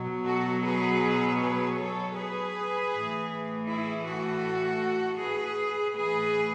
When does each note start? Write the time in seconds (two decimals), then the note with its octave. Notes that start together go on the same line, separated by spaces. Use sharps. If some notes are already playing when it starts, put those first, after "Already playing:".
Already playing: B2 F#3
0.25 F#4 A4
0.63 G#4 B4
1.39 G#4 B4
1.77 A4 C#5
2.16 G#4 B4
2.91 A2 E3
3.68 E4 G#4
4.06 F#4 A4
5.19 G#4 B4
5.95 A2 E3 G#4 B4